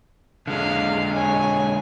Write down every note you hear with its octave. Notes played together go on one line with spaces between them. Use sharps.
D3 G#3 F5
C#5 G#5